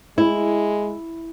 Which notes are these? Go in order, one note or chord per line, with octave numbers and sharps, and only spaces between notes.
G#3 E4